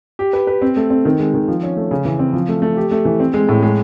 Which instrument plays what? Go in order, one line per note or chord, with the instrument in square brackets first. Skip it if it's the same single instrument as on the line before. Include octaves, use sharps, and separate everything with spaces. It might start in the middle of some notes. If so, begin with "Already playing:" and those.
[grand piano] G4
B4
B4
C4
A3
C4
D#3
G#3
D#3
F3
C#4
A3
C#3
E3
C4
F3
A3
A3
G4
A3
E3
C4
G#3
A2
G#3